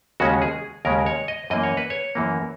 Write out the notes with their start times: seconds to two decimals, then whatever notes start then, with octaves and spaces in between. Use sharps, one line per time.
0.20 D#2 C#3 G#3 C#4 F#4
0.42 G#4
0.85 D#2 C#3 G#3 C#4 A#4
1.06 C#5
1.28 D#5
1.50 F#2 E3 A#3 D#5
1.63 C#5
1.77 B4
1.90 C#5
2.15 F#2 E3 A#3